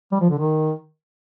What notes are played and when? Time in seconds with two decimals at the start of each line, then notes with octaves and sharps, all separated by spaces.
0.12 G3
0.21 F3
0.30 D3
0.39 D#3